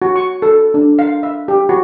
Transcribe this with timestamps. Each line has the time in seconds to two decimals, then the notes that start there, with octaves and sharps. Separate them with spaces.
0.02 F#4
0.16 C#6
0.42 A4
0.74 D4
0.99 F5
1.23 E5
1.48 G4
1.69 F#4